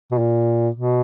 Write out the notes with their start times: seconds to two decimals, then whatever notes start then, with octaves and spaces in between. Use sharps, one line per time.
0.11 B2
0.18 A#2
0.74 B2